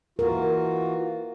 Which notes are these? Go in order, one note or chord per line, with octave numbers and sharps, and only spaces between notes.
E3 F4 F#4 A#4